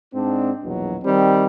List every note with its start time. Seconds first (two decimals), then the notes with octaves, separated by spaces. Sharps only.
0.14 G#2 C4 D4
0.63 A#1 E2 B2 F#3
1.04 D#3 G3 C4